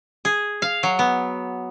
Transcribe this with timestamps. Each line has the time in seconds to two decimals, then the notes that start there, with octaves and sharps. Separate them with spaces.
0.25 G#4
0.62 F5
0.83 F#3
0.99 B3